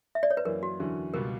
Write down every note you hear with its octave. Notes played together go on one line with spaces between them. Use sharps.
E5
D5
C#5
B4
F#2 E3 A#3 A#4
F#4
E2 D3 F#3 C#4 E4
C#2 B2 G3 A#3 A#4